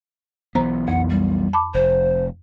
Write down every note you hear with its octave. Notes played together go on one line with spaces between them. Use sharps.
B1 E3 B3 C5 A#5
F2 F#5
G3
A5 B5 D6
F1 C5